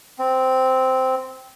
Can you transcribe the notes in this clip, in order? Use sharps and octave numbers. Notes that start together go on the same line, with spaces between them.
C4